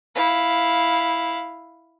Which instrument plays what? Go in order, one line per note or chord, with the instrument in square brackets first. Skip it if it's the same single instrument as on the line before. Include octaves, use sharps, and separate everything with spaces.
[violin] E4 F5